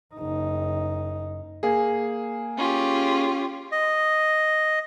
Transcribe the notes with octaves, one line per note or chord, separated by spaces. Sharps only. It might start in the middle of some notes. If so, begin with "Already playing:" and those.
F#1 D#4
A#3 G#4
C#4 F4 G4
D#5